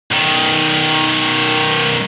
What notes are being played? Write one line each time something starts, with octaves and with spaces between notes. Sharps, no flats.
B1 D#3